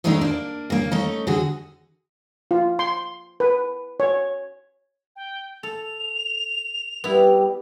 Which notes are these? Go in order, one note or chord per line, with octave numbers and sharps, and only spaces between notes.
D#3 F#3 G#3 A3 D4 D#4
A#3 D4
C#3 A#3
A3 C#4 D#4
D3 F#4 G#4
F4
C6
B4
C#5
G5
A4 F7
G3 B3 E4